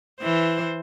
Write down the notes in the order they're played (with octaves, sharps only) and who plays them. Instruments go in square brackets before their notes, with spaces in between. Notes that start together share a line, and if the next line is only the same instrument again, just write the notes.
[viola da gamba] E3 C5